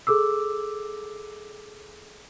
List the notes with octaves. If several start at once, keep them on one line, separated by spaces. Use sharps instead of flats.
G#4 A4 D6 E6